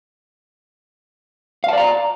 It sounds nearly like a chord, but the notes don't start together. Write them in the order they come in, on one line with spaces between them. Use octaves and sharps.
F5 A5 D5 A#5